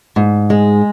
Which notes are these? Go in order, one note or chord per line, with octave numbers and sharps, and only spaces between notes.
G#2
G#3